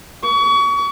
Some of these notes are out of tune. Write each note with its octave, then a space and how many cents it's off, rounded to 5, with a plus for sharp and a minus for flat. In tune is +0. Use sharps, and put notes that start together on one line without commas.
C#6 +35